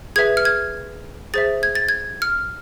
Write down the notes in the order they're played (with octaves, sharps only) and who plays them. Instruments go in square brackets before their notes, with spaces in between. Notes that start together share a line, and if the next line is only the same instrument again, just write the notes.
[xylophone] G#4 B4 E5 G#6
F6
G#6
G#4 C5 E5 A6
G#6
A6
G#6
F6